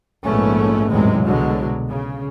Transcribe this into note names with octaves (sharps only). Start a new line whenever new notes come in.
A#1 G#2 A3 B3 C#4
A1 E2 G#2 C3 F#3 G#3
C2 B2 D3 F#3 G#3
C#3